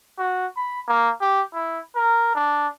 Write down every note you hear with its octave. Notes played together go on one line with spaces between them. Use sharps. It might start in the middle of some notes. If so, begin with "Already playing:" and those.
F#4
B5
A#3
G4
E4
A#4
D4